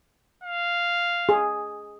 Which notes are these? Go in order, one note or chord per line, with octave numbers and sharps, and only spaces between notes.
F5
G#4